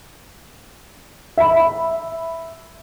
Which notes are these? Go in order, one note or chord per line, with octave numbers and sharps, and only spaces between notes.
E5 B5